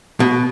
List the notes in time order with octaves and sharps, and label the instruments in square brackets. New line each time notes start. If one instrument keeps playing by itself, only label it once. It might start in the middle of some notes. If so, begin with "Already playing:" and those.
[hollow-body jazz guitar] B2